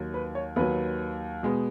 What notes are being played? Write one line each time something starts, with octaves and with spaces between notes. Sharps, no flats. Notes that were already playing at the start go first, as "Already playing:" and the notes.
Already playing: D#2 D#3 F#3
B4
C#5
D#2 D#3 F#3 B4
B2 G#3 B3